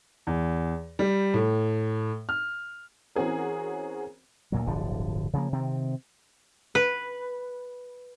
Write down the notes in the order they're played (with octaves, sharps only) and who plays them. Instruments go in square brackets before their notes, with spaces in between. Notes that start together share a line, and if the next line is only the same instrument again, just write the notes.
[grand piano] E2
G3
A2
F6
[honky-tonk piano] E3 C4 C#4 F#4 G#4 A#4
[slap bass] D2 A#2 F#3
D1 G1 D3 F3
C#3 F3 G#3 A#3
C3 D#3 C4
[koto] B4